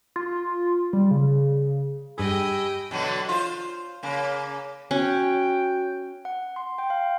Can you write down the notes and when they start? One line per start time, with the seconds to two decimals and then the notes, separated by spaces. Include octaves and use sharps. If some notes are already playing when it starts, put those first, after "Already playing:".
0.16 F4
0.93 G3
1.11 C#3
2.18 G2 G4 G#4 D#5 G5 G#5 B5 E6
2.91 B2 D3 F#3
3.29 F4 C5
4.03 C#3 A#3
4.91 C#4 F#4 C#5 G5
6.25 F#5
6.56 C6
6.78 G5
6.90 F5